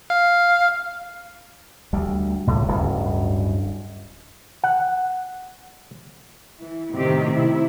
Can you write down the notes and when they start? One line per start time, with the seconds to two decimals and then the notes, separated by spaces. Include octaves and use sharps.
0.10 F5
1.93 D2 G3
2.47 C#2 A2
2.68 D1 G2 C#3
4.64 F#5
6.59 E3
6.92 A2 C3 D#3 C4 G4
7.32 C3 E4